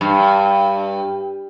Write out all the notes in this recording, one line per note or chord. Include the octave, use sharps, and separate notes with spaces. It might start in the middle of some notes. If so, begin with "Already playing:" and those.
G2